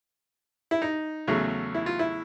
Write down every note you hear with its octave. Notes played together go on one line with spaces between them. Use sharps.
E4
D#4
E2 C#3 F#3 A3
E4
F4
E4